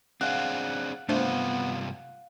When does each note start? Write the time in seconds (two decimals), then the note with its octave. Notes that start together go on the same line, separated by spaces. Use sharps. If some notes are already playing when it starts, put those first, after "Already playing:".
0.21 C4 D4 G#4 F5 F#5
1.09 G2 C3 A3 B3 D4 F4 C5